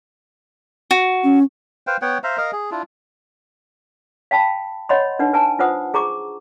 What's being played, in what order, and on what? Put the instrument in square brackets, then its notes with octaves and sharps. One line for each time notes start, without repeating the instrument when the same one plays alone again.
[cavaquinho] F#4
[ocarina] C#4
[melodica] B4 C5 F5 G5
B3 C#5 F#5 G5
C5 E5 F5 A#5
A#4 D#5 F5
G#4
D4 E4 F4
[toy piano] F5 G5 A5 B5
C#5 D#5 F#5 B5 C6
D4 D#4 B4 F#5
B4 G#5 A5
F4 B4 C5 F#5 D#6
G#4 A#5 C#6 D6